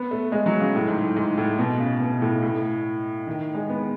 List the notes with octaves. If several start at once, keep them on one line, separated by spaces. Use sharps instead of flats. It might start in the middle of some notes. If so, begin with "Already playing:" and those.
Already playing: B3
A3
G#3
F#3
C#3
A2
G#2
A2
G#2
A2
B2
C#3
B2
A2
A2
D#3
G#3
B3